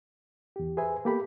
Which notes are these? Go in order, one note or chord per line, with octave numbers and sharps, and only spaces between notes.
E2 G4
G#4 B4 C5 E5 G#5
A#3 B3 G4 A4 B5